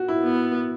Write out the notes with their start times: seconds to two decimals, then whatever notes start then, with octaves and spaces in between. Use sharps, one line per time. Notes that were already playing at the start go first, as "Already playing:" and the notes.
Already playing: F#4
0.08 E4
0.23 B3